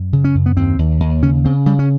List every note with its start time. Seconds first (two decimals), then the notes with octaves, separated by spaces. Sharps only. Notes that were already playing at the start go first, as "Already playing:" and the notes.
Already playing: F#2
0.13 C#3
0.24 C#4
0.35 F#2
0.46 B3
0.57 D#2 C4
0.79 D#2
1.00 D#2
1.22 C#3 C#4
1.45 C#3 C4
1.66 C#3 G3
1.79 C#4